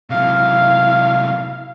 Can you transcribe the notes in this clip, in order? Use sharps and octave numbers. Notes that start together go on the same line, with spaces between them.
C3 F#3 E4 F5